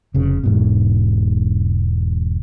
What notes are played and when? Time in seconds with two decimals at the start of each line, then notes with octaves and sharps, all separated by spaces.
0.14 F1 C#3
0.44 E1 G#2 B2